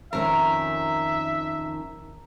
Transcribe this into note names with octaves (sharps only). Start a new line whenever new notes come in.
F2 D#3 C#4 A#4 E5